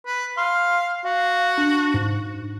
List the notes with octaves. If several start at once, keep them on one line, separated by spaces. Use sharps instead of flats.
B4
F5 C6
F#4 F5
D4
G#2